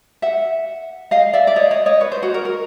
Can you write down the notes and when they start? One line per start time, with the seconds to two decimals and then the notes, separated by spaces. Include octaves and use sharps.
0.22 E5 F#5
1.11 D#5 F5
1.33 D5 E5
1.47 D5
1.56 C#5 D#5
1.71 C#5 D#5
1.86 C#5 D#5
2.01 B4 C#5
2.12 C5
2.23 F#4
2.34 A#4
2.45 A#4